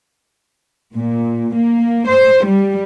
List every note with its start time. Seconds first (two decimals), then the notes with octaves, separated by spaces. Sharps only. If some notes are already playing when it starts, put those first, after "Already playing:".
0.95 A#2
1.55 A#3
2.08 C5
2.45 G3